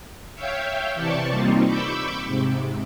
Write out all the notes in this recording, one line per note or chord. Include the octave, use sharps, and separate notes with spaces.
C#5 E5 F5 G5 G6
C3 E3 D5 A5 C#6
G3 A#3 C4 D#4 F4
B5 C#6 D6 E6 G6
G#2 C3